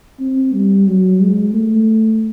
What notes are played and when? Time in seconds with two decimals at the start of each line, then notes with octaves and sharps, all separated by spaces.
0.20 C4
0.54 G3
0.87 F#3
1.20 G#3
1.54 A3